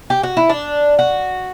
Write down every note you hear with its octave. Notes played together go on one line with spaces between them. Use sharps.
G4
F#4
E4
D4
F#4